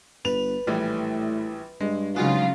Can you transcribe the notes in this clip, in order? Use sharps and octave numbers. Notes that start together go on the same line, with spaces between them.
G1 B4 F7
A#1 A2 E3 G3
G2 G#3
C#3 F#3 G#3 D#4 F4 F#4